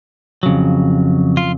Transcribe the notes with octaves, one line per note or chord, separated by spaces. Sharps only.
F2 C#3 F#3
F4